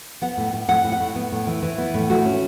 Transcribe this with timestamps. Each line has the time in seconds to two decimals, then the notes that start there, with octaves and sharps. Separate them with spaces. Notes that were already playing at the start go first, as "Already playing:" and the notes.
0.22 B3 F#5
0.37 A2
0.53 A2
0.68 A2 F#5
0.84 A2
0.92 F#5
1.00 A2
1.16 B3
1.32 A2
1.47 E3
1.63 E3
1.78 B3
1.94 A2
2.09 A3 F#4
2.25 C#4